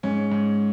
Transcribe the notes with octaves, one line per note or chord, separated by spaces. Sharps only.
G#2 C#4
G#2